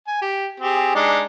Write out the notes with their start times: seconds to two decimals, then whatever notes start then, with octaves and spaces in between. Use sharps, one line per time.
0.07 G#5
0.22 G4
0.60 C4 G4 G#4
0.95 G#3 D4 D#4